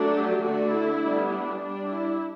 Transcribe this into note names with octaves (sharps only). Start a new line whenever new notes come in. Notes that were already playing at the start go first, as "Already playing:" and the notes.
Already playing: F#3 A3 D4
G4
D3 A3 D4 F#4
E4
G3 B3 D4
D4
G3 D4
E4